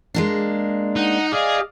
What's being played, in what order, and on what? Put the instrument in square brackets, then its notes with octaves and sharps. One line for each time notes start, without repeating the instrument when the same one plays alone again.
[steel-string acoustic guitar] G#3 A#3 D4
[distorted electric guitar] D#4 [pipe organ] F#5
[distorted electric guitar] G#4 [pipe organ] D5 D#5 F5